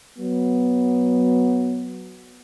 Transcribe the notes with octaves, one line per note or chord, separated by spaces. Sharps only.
F#3 B3